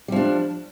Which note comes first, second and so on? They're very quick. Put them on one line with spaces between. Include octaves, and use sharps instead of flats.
G3 F3 D4